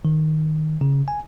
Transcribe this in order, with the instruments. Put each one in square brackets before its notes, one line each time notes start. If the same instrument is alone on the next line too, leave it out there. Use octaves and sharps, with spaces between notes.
[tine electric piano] D#3
C#3
G#5